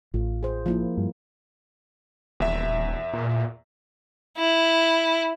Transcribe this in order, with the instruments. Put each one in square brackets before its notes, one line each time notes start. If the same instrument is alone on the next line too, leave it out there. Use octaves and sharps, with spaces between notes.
[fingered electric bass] A1 [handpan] F4
[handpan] G#4 C5
F3 A#3 E4
[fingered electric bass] G2
[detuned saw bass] D#1 [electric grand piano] E2 E5
[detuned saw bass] A#2
[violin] E4